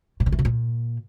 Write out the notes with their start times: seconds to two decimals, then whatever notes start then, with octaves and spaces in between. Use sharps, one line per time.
0.20 A#2
0.26 D3
0.32 E3
0.39 B2
0.45 A#2